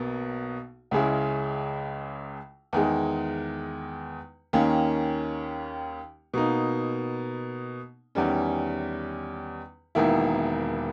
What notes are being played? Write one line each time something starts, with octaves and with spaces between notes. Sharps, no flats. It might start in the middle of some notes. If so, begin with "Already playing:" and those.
Already playing: B1 B2 A#3
C#2 C#3 G#3 C#4 E4
E2 D#3 G#3
D#2 D#3 A#3 C#4
B2 A#3 D#4
E2 D#3 G3 C#4
E1 E2 D#3 A#3 E4